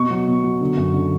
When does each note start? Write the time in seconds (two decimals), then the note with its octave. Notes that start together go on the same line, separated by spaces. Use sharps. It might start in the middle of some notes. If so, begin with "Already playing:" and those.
Already playing: B2 C#6
0.11 F#3
0.28 B2
0.44 F#3
0.61 D3
0.77 F#2
0.94 D3